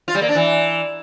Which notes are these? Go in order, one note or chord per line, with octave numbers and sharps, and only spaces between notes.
F4
G3
A#3
D4
E3